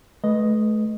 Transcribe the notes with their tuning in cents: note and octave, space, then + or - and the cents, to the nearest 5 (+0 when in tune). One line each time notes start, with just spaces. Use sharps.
A3 -35 B4 +0 D#5 +0